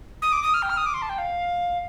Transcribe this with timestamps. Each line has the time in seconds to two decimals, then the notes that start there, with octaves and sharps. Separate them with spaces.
0.22 D#6
0.32 D6
0.43 D#6
0.54 F6
0.62 G5
0.70 F6
0.77 D#6
0.86 D6
0.94 C6
1.02 A5
1.09 G5
1.18 F5